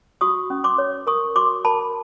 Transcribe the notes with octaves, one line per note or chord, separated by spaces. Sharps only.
F#4 C#6 D#6
C#4
C6 D6
C#5
A#4 C#6 D#6
F#4 C6 D6
A#4 A5 B5